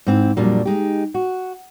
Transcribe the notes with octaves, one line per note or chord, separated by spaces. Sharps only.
G#2 C4 E4
F2 A#2 F#3 G3 D4
G#3 D#4 G4
F#4